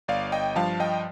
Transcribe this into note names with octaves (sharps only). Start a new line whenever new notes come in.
G1 D5 F5
D#5 G5
G2 F3 F5 A5
D#5 G5